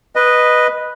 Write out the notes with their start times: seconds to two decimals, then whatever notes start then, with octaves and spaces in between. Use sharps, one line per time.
0.16 B4 D#5